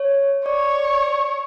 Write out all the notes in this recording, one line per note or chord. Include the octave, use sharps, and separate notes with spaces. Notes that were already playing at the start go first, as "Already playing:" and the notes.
Already playing: C#5
C#5 D5